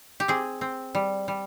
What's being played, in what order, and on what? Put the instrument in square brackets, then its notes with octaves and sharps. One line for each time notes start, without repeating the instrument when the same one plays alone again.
[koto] G4
C4 G#4
C4
G3
G3